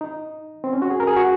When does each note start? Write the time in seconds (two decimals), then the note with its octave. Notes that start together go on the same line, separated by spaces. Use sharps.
0.01 D#4
0.64 C4
0.73 C#4
0.82 F#4
0.90 G#4
1.00 A#4
1.07 G#4
1.17 F#4